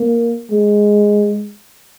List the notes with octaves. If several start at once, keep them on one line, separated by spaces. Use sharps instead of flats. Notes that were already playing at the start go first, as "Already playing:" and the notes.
Already playing: A#3
G#3